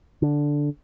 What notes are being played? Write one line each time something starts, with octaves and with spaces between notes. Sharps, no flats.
D3